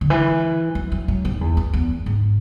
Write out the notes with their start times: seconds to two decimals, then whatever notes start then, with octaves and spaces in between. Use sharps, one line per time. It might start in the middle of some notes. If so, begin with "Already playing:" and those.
0.01 D3
0.10 E3
0.75 F#3
0.92 F#3
1.08 F#3
1.25 G#2
1.41 E2
1.57 F#2
1.73 E2
2.06 G#2